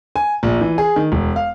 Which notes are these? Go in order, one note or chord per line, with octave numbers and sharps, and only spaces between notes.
G#5
A#1
E3
G#4
D#3
E1
F5